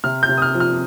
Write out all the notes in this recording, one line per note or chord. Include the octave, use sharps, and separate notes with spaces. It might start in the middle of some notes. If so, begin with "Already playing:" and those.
C3 F6
G6
C3
D#6
F6
F3
F6